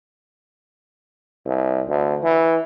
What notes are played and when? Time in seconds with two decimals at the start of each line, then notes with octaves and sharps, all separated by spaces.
1.46 C2
1.89 D2
2.23 E3